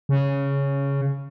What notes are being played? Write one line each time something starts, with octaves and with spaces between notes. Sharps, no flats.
C#3